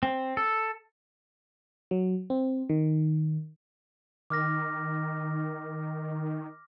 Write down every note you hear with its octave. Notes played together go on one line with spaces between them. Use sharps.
C4
A4
F#3
C4
D#3
D#3 D6 F6 A#6